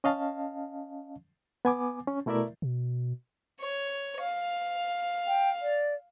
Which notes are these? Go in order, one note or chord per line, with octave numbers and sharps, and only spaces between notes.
C#4 D#5 F5 A5
B3 G#5 D6
C#4
B2 A3 E4 A#4 D5 E5
B2
C#5
F5
G5
D5